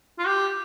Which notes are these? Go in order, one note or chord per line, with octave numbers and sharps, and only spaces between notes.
F4
G4